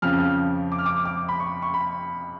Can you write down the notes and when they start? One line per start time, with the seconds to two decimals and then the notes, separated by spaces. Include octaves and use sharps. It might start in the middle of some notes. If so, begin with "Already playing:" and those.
0.02 F2 C#3 F3 F6
0.72 D6
0.78 F6
0.86 D6
1.05 D6
1.29 B5
1.40 C#6
1.62 C#6
1.74 B5